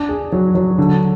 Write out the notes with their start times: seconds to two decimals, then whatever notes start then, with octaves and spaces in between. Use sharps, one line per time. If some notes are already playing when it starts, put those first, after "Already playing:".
Already playing: D4
0.09 G#4
0.32 F#3
0.55 F#3
0.78 D3